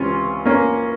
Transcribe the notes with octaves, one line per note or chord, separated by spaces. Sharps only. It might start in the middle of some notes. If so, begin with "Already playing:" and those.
Already playing: C#2 C3 E3 C#4 F4
A#3 C#4